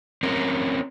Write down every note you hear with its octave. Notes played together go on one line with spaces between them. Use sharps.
C4 C#4 A#4